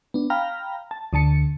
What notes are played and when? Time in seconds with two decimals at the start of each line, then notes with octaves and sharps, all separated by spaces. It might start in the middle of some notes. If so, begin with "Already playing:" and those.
0.14 B3 D4
0.30 F5 G5 A#5 B5 F6
0.91 A5
1.13 D2 D3 A5 C#7